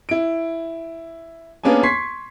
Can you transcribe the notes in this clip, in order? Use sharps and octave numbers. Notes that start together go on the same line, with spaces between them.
E4 D7
A#3 B3 C#4 D4 G#4 G#5
C6 C#6 G#6 B6 C7